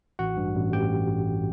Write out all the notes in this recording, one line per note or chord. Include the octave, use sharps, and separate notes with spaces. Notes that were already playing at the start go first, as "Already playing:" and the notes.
A1 F#4 F#5
G2
A1
A1 G4 G5